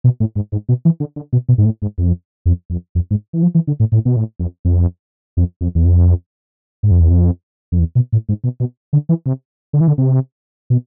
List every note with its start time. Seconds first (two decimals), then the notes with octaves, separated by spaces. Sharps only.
0.04 B2
0.20 A2
0.36 G#2
0.52 G#2
0.69 B2
0.85 E3
1.00 D3
1.16 D3
1.33 B2
1.49 B2
1.58 G#2
1.65 A2
1.82 G#2
1.98 F2
2.46 F2
2.70 F2
2.95 F2
3.11 G#2
3.33 E3
3.43 F3
3.55 E3
3.67 D3
3.80 A2
3.92 A2
4.05 B2
4.16 A2
4.40 F2
4.65 F2
5.37 F2
5.61 F2
5.75 E2
5.85 F2
6.83 G#2
6.91 F2
7.00 E2
7.10 F2
7.72 F2
7.79 E2
7.95 B2
8.12 A2
8.29 G#2
8.44 B2
8.60 B2
8.93 D3
9.09 E3
9.26 C3
9.73 D3
9.81 E3
9.88 D3
9.98 C3
10.70 B2